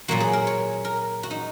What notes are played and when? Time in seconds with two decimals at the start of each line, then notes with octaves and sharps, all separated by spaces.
0.08 A#2 F#3 A#3 F#4
0.20 G#4
0.33 A#4
0.47 C#5
0.85 A#4
1.23 F#4
1.31 D#4